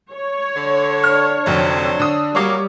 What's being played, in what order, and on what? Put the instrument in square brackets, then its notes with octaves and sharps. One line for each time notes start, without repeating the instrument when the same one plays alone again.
[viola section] C#5
[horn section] D3
[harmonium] D4 [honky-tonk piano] F6
[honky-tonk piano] F1 F2 D3 [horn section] F#3 C5
[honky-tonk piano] D3 D#6
[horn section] F#3 A#3 [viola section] G3 [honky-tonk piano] C#5 D6